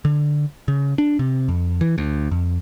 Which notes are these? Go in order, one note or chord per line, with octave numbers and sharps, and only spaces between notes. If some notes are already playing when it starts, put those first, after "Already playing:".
D3
C#3
D4
C3
F2
E3
D2
F2